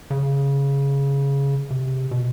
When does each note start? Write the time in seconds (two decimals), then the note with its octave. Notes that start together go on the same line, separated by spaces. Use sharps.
0.10 C#3
1.70 C3
2.11 B2